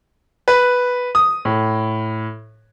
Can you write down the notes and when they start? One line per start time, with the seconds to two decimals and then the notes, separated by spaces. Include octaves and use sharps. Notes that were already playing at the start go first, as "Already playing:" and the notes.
0.48 B4
1.15 D#6
1.45 A2